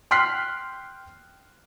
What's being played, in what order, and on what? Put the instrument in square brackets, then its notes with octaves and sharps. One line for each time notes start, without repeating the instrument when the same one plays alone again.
[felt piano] G5 C6 F6 F#6 B6 C7